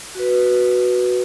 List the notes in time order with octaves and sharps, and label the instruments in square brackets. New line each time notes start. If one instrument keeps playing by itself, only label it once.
[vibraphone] F#4 B4